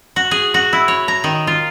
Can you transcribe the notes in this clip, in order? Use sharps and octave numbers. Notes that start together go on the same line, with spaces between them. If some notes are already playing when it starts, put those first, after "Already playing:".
F#4
G#4
F#4
E4
C#5
A#5
D#3
F4